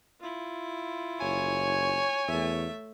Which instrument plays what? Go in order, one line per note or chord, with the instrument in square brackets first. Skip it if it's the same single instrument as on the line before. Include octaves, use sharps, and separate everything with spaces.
[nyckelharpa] E4 F4
[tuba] F#1 [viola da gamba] C#5 [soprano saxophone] G#5
[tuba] E2 [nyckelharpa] A3 E5